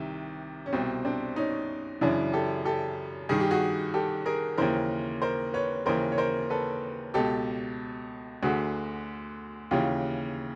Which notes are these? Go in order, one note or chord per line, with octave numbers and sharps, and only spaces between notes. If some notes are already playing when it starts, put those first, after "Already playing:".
Already playing: C2 C3 D#3
C#4
C2 B2 C4
C4 D4
C#4 D#4
F#2 C#3 E3 D4 E4
G4 A4
G4 A4
G2 D#3 G#4
G4
F#4 G#4
G4 A4
G#4 A#4
D#2 C#3 E3 A#4 C5
A#4 C5
B4 C#5
D#2 C#3 E3 A#4 C5
C#5
A#4 C5
A4 B4
C#2 B2 G4 A4
D2 D3 F#4 G#4
D#2 C#3 E3 F4 G4